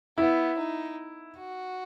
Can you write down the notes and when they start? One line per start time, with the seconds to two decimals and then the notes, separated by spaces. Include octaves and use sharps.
0.18 B3 E4
0.58 D#4
1.38 F#4